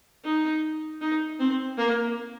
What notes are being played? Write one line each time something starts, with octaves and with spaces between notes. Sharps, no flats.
D#4
D#4
C4
A#3